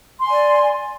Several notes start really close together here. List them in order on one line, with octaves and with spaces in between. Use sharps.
C6 G#5 D5